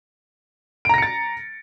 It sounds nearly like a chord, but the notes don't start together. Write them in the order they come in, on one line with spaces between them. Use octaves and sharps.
D7 A#5 A#6 C#7 A6